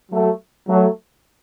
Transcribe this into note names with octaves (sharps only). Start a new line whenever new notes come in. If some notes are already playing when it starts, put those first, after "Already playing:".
F#3 A3
F#3 A3